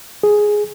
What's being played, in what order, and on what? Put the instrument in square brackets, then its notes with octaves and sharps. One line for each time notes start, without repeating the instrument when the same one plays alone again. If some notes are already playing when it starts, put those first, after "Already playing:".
[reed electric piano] G#4